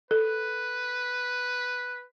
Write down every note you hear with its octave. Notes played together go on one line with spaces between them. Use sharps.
A4 B4